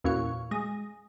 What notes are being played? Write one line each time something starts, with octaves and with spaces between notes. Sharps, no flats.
E2 A#2 C#4 F#4 F5 C#6
G#3 A#6